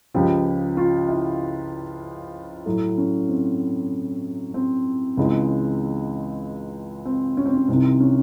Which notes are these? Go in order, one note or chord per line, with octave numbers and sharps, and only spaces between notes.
C#2 C#3 F3 G4
F4
E4
A2 F#3 A3
C#4
C4
C4
C#2 C#3 E3 G#3
C4
C#4
C4
C#4
C2 C3 D#3 C4
C#4